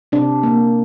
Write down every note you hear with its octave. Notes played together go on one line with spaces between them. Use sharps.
C3 D4
A#3